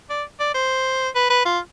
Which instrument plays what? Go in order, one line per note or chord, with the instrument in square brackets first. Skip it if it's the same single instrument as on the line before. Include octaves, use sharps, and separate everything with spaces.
[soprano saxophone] D5
D5
C5
B4
B4
F4